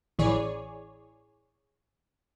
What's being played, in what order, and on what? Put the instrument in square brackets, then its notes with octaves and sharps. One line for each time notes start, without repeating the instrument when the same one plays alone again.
[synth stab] A1 E3 G#4 C#5 D5